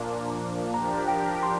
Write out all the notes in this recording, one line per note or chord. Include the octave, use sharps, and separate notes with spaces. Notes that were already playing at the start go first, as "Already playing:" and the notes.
Already playing: A#2 F3 A#3 D4
F3 D4 G4 A#4 A#5
G5
C6